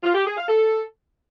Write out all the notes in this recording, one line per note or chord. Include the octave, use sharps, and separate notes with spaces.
F4
G4
G#4
F5
A4